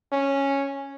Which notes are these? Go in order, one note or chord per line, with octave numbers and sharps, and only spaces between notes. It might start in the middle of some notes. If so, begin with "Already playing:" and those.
C#4